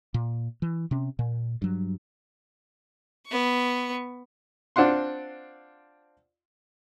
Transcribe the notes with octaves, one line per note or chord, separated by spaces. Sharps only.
A#2
E3
C3 C#4
A#2
G2 F#3
B3 C#6
C4 D4 F4 F#5 C6